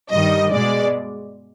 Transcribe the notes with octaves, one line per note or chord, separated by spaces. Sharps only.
G2 D#3 G3 D#5
B2 G#3 D5